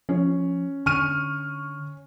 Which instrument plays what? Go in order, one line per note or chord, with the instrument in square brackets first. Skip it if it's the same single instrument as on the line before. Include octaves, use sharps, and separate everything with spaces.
[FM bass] F3 [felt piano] C#4
[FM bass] D3 [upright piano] C#6 F6 D#7